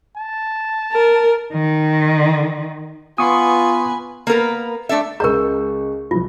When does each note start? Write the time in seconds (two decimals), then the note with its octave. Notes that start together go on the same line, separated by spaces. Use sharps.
0.17 A5
0.92 A#4
1.53 D#3
3.18 B3 F4 B4 G#5 C6 C#6 D#6
4.27 A#3 B3 A#4 B4
4.89 A3 D4 A4 E5
5.20 C#2 G#4 A#4 D#5 A#5 C#6 G6
6.11 C2 F3 F4